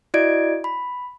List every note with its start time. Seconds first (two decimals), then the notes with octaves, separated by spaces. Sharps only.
0.14 E4 F#4 D5 D#5 G#6 D7
0.64 B5